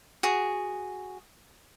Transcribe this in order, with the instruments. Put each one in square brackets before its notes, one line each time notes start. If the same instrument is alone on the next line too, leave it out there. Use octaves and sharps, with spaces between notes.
[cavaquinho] F#4 G#4